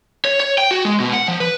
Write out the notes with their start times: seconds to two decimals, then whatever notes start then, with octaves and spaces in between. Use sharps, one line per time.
0.25 C#5
0.40 C#5
0.58 G5
0.71 F#4
0.85 G#3
1.00 B2
1.13 F#5
1.28 F3
1.40 B4